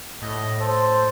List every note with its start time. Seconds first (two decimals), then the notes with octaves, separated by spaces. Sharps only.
0.22 A2 D#5
0.60 A4 C5